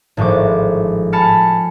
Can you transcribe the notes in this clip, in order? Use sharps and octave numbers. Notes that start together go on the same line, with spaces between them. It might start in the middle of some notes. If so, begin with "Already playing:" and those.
G#1 A2 F3 C#6 D6
G#5 A5 B5 F6 C#7